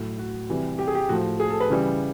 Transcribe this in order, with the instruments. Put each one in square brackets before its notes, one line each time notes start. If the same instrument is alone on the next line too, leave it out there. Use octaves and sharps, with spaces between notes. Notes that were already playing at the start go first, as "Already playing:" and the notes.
Already playing: [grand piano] A2 F#3
F#4
C3 E3 G3
G4
G#4
G4
A2 F3 F#4
G#4
A4
B4
C#3 E3 G3